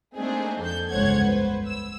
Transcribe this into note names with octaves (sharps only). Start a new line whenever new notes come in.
A3 A#3 C4 D4 D#4 G#4
F2 A4 G6
G1 C#2 C5 C#5 F#5 G#6
B4 C5
E6